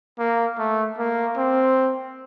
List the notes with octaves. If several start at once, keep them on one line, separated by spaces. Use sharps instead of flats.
A#3
A3
A#3
C4